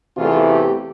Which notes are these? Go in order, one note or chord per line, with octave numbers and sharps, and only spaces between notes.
E2 C3 E3 A3 F4
G4